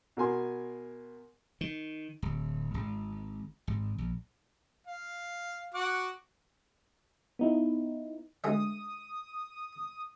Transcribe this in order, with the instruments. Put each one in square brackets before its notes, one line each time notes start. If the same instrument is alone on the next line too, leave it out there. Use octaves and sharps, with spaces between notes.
[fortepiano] B2 A#4 G#5 C6
[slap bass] D#3
D1
G#1
G#1
A#1
[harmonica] F5
F#4 F#5 D6
[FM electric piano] B3 D#4 E4
[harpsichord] D2 G#3 E5 [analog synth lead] D#6